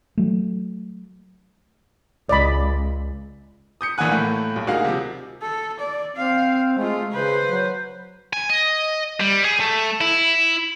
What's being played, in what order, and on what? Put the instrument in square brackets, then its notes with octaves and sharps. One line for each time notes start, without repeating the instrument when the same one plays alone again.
[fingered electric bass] F#3 A3
[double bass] C#2 [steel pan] D5 D#5 B5
[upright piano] D#6 G6 C#7
A#1 E3 A#3 F#5 G#5 F#6
A2 A3 A#3
B1
D2 A#3 D#4 F#4 G#4 F5
C3 F3
[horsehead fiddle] A4
D5
[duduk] C4 [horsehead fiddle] F5
[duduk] G#3 [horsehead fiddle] A3 F4
[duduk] C#3 [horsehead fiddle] B4 C5
[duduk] F#3
[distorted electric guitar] G#5
D#5
G3
G#4
A3
E4